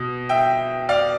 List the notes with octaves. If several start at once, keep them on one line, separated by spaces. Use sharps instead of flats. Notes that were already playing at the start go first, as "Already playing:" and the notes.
Already playing: B2
E5 G5
D5 F5